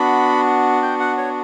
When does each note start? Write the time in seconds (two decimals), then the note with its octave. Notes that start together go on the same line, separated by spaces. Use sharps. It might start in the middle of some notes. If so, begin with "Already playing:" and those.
Already playing: B3 D4 F#4 B5
0.83 G5
1.00 F#5
1.17 C#5